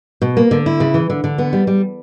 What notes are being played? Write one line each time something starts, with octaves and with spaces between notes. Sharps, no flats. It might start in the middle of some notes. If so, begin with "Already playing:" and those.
B2
A#3
D3
E4
C#3
E3
D3
D3
B3
G3
G3